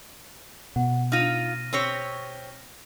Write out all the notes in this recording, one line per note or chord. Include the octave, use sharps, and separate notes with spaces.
B2 F#5
D#4 F4 F6 A#6 D#7
C4 G4 C#5